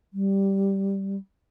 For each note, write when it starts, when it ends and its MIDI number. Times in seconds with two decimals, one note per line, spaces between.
0.13 1.17 55